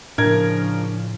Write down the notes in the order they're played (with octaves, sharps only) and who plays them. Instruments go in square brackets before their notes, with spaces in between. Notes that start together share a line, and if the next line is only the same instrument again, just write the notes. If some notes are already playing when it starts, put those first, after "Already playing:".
[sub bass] A2 [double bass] C#3 F3 [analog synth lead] D4 [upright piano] A#4 G#6